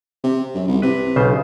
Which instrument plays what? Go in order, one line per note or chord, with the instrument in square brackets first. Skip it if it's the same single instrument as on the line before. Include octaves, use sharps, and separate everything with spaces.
[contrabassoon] C3
F#2
C2
[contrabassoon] C3 [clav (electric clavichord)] B4
[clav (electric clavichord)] B1 C#3 C5